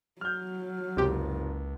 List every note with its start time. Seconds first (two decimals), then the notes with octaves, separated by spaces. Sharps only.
0.21 F#3 F6 G6
0.97 F#1 C#2 C3 G4